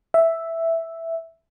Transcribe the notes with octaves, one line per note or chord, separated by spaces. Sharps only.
E5